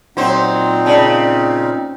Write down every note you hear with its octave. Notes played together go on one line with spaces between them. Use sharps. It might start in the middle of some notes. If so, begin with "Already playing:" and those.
A#2 F#3 C4 D#4 F4 C5
C#3 D5 A5